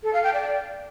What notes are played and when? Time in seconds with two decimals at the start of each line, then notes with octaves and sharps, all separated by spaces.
0.03 A4
0.13 F5
0.24 G5
0.34 D5